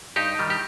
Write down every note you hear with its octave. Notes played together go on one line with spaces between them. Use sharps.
G2 D#4 G4
D#3 G3
G4